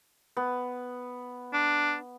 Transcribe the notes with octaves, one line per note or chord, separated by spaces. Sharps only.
B3
D4